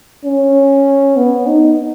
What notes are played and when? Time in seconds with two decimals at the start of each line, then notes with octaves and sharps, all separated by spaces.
0.24 C#4
1.17 B3
1.47 D#4